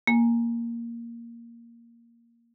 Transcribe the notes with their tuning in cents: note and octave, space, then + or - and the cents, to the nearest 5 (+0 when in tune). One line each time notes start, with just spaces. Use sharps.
A#3 +0 G#5 +0